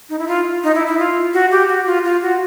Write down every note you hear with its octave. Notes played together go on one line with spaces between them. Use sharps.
D#4
E4
F4
D#4
E4
E4
F4
F#4
G4
F#4
F4
F4
F#4